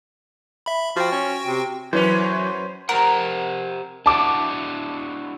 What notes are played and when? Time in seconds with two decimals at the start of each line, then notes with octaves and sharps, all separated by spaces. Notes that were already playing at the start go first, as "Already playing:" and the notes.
0.66 E5 B5
0.97 F3 F#4 G5
1.12 C#4
1.47 C3
1.93 F#2 E3 F#3 C#4 B4 C5
2.89 G4 A#4 C5 F#5
4.06 D4 E4 F#4 A5 D6